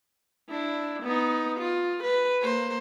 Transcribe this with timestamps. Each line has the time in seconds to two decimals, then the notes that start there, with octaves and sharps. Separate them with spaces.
0.50 D4 E4
1.03 B3 D#4
1.59 F4
2.03 B4
2.42 A#3 C5